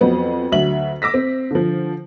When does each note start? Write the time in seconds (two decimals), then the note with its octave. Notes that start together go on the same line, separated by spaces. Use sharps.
0.01 F2 F#3 B3 C4
0.52 D2 F#3 E5 F#7
1.02 D6 E6 A#6 B6
1.14 C4
1.51 D3 F3